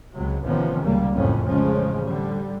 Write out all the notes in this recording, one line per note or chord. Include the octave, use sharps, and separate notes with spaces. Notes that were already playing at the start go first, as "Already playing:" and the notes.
C#2 C3 F#3
A1 C3 D#3 F3 B3 C#4
C#2 G3 A#3
F#1 F2 A2 C#4
A1 C#3 F3 G#3 C#4
D3 G3